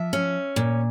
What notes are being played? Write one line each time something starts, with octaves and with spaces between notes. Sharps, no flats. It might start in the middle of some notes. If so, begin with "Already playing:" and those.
Already playing: F3 E5
C#4
A#2